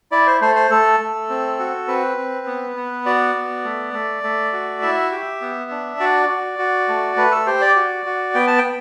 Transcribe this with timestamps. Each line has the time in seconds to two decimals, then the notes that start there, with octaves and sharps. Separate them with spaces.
0.12 E4 D5
0.27 C5
0.41 A3 C5
0.56 C5
0.71 A3 A4
1.00 A3
1.29 C4
1.59 F#4
1.88 C4 B4
2.17 C4
2.47 B3
2.76 B3
3.06 F#4 D5
3.35 B3
3.65 A3
3.93 A3
4.23 A3
4.53 F#4
4.82 E4 E5
5.12 G4
5.41 B3
5.71 D4
6.00 F#4 D5
6.29 F#4
6.59 F#4
6.88 A3
7.17 A3 B4
7.31 A4
7.46 G4 C5
7.61 D5
7.76 F#4
8.06 F#4
8.34 B3 G5
8.47 A5
8.58 G5
8.64 B3